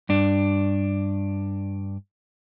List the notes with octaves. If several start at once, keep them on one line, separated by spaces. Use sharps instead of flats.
G2 D4